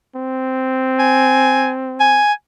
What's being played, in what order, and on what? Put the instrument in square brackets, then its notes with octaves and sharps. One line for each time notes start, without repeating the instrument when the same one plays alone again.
[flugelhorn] C4
[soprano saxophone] G#5
G#5